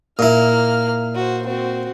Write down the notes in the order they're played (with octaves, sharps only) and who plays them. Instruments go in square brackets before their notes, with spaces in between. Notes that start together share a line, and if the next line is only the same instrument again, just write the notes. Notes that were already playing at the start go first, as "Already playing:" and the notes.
[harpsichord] A#2 E4 [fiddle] A#3 F6
[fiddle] F#4 C5
C4 F#4